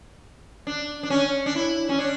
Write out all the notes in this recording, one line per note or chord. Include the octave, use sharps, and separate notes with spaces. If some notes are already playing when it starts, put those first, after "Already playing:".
D4
D4
C#4
D4
E4
C#4
D4